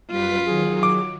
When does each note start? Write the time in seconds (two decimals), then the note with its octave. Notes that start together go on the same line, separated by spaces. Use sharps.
0.11 F#2 G3 F4 B4 B6
0.45 D#3 F#3 G#4
0.83 D6